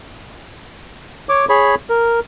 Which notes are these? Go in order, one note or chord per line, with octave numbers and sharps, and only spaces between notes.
C#5 D6
G#4 C#5 B5
A#4